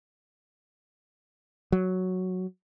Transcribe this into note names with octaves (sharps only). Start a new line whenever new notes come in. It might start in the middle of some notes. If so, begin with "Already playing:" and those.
F#3